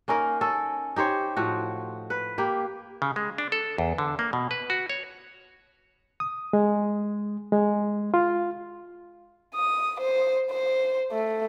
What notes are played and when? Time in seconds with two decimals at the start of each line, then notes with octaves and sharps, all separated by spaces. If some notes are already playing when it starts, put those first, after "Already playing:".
0.08 A#3 C#4 D#4 A#4
0.41 C#4 A4
0.96 D#4 G4 C5 C#5
1.37 A2 F3 F#4
2.10 B4
2.38 A#3 G4
3.02 C#3
3.16 G#3
3.38 D4
3.52 A4
3.78 E2
3.98 D3
4.19 A#3
4.33 B2
4.51 B4
4.70 F#4
4.90 C#5
6.20 D#6
6.53 G#3
7.52 G#3
8.14 F4
9.55 D#6
10.01 C5
10.51 C5
11.12 A3